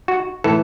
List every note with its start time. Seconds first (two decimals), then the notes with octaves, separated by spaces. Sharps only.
0.08 F#4
0.44 A2 E3 A4